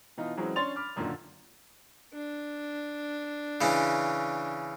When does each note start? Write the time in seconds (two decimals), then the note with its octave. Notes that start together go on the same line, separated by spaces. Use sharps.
0.17 B2 E3 D#4 F4
0.37 E3 F#3 G#3 C4 C#4
0.56 C#4 D4 C#5 C6 A6 F7
0.76 B5 D6 F6
0.96 F1 F#2 A#2 D3 D#3
2.14 D4
3.61 C#3 E3 C#4